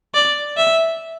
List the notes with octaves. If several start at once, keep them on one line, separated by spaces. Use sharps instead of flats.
D5
E5